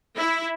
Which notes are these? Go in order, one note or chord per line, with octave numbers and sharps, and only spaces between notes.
E4